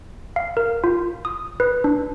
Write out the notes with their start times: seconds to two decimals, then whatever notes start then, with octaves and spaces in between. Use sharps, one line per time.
0.36 F5
0.57 A#4
0.84 F4
1.25 D#6
1.60 B4
1.84 D4